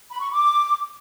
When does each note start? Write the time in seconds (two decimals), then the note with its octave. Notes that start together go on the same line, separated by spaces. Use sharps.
0.12 B5
0.21 C#6
0.30 D6